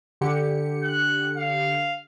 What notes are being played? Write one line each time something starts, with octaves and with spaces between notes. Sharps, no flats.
D3 G4 C#7
F#6
F5